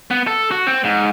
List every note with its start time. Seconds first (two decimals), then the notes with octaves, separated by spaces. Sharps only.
0.11 B3
0.27 A4
0.51 F#4
0.67 C4
0.84 G#2